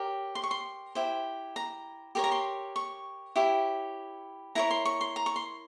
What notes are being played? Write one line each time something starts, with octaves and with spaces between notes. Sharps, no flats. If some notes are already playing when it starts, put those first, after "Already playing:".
Already playing: G4 A#4 C#5
C6
C#6
C6
E4 G4 C5
A#5
G4 A#4 C#5 C6
A#5
C6
C#6
E4 G4 C#5
E4 A#4 C#5 A#5
C6
C#6
C6
A#5
C#6
C6